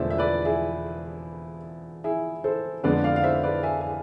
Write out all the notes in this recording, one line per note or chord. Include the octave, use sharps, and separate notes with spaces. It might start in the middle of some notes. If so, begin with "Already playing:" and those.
Already playing: E1 E2 D3 F3 A3 C5 D5 E5
E5
B4 D5
E4 G#4
E4 G#4
A4 C5
F2 D3 G#3 B3 B4 D5
D5 F5
F5
C5 E5
B4 D5
E5 G#5
G#5